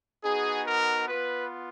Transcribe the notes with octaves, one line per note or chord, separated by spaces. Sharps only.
B3 D#4 F#4 G#4
A#4
B3 F4 B4